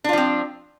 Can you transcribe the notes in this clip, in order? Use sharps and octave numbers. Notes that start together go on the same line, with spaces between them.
F3 C4 D4 F4